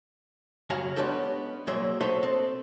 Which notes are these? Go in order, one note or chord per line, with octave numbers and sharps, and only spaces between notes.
F#2 C#3 F#4 F5 G#5 A#5
G#3 B3 C#4 D4 G4 A4
C2 A#2 F#3 G#4 E5 C6
F#4 A4 C5 C#5 D#5 E5
C4 A4